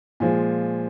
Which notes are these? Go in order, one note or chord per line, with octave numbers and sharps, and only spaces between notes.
A#2 F3 G#3 G#5